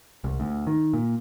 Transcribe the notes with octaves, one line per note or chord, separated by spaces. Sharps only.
C2
D2
D#3
A#2